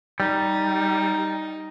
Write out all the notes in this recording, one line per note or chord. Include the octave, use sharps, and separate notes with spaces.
G3 D#4